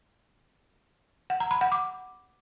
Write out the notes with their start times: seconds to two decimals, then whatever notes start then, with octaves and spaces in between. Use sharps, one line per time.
1.30 F#5
1.40 A#5
1.51 B5
1.61 F#5
1.72 D6